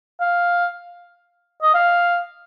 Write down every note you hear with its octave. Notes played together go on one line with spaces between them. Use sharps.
F5
D#5
F5